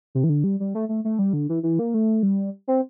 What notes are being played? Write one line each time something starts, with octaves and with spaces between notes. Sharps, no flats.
C3
E3
D3
G3
G3
A3
A3
A3
G3
D3
E3
E3
A#3
A3
G3
C4